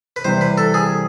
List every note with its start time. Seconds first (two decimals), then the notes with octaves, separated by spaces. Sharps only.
0.16 B4
0.24 C3 E3 G3 C4 C5
0.41 B4
0.58 A4
0.74 G#4